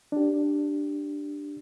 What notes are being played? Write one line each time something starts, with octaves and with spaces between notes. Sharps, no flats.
D4 G4